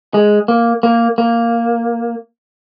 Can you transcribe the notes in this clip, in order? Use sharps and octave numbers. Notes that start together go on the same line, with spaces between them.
G#3
A#3
A#3
A#3